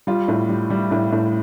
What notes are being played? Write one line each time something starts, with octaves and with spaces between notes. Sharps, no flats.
G3 F4
A2
G3
G3
A2
A2